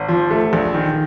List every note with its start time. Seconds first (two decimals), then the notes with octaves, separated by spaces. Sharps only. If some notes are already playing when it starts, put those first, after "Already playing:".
Already playing: G#1
0.08 F3
0.30 A3
0.53 A#1
0.75 D#3